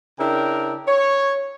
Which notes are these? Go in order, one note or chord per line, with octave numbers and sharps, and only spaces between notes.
C#3 D4 E4 A#4 G5
C#5